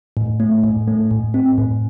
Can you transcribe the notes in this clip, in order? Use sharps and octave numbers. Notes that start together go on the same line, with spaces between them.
A2
A3
A2
A3
A2
C4
A2